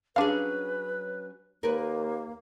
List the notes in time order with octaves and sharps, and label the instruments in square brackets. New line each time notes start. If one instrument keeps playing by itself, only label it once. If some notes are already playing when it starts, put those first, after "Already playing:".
[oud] F#3 C#4 G#4 [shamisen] D4 F5 [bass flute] B4
[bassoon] D#2 [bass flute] A#3 [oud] A#4 B4